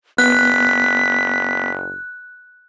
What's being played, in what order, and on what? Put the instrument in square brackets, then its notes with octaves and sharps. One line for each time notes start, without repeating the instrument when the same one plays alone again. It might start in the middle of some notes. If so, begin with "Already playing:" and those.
[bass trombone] F#1 [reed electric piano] B3 [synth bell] F#6 [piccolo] B6